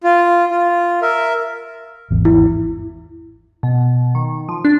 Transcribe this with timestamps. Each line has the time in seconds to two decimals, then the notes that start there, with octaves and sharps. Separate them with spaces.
0.04 F4
0.51 F4
1.02 A#4 E5
2.11 G#1 E2
2.25 E4
3.63 B2
4.15 D#3
4.49 F3
4.65 D4